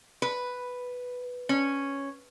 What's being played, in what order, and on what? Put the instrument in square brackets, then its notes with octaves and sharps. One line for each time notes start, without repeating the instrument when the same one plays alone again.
[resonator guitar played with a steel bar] B4
C#4